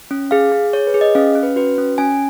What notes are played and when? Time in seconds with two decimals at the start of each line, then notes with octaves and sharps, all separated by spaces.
0.11 C#4
0.31 G#4 F5
0.52 G#4
0.73 G#4 C#5
0.87 B4
0.94 G#4
1.01 D#5
1.15 C#4 F5
1.35 C#4
1.43 B4
1.56 F#4 B4
1.78 C#4
1.98 C#4 G#5